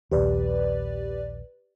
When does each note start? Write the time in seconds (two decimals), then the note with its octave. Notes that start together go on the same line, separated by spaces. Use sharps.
0.12 A#1 D#2 G4 B4 D5